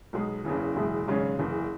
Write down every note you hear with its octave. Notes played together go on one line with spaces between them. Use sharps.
B1 B2 G#3
F#1 E2 C#3 E3
F#1 E2 B2 G#3 E4
G#1 F#2 C#3 G#3 C#4
F#1 E2 E3